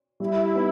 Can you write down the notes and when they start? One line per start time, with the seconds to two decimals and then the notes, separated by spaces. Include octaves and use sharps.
0.20 G3 E4
0.54 B3 D#4